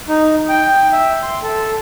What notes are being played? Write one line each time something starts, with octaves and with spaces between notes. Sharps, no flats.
D#4
G5
E5
C6
A4